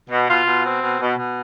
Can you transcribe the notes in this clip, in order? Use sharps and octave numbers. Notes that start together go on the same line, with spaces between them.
B2
B2 F4
B2
C4
B2
B2
B2